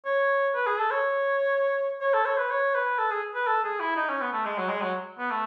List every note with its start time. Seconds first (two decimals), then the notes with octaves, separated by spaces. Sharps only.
0.05 C#5
0.55 B4
0.67 G#4
0.78 A4
0.91 C#5
2.01 C#5
2.14 A4
2.25 C#5
2.38 B4
2.50 C#5
2.74 B4
2.99 A4
3.11 G#4
3.35 B4
3.47 A4
3.64 G#4
3.80 E4
3.96 D#4
4.09 C#4
4.21 B3
4.33 A3
4.45 G#3
4.58 F#3
4.69 G#3
4.82 F#3
5.19 B3
5.30 A3